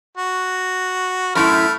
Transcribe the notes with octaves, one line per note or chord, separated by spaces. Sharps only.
F#4
F#2 A2 A3 E4 B5 F6